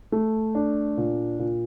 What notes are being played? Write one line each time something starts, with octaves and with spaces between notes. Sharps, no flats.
A3
D4
A#2
A#2